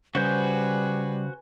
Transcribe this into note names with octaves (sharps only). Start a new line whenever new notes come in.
C#3 G3 F#4 G#4 B4 C5 G6